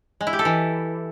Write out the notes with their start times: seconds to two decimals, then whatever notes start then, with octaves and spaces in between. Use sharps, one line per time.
0.21 G#3
0.27 E4
0.33 G4
0.39 A4
0.45 E3